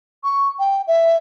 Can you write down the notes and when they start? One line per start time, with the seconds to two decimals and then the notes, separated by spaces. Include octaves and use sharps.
0.23 C#6
0.59 G5
0.87 E5